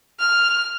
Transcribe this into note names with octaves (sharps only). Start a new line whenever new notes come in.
F6